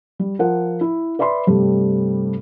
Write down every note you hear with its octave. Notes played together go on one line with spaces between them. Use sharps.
G3
F3 A#4 F#5
E4
B4 D5 E5 B5 C6
G2 C3 G3 A3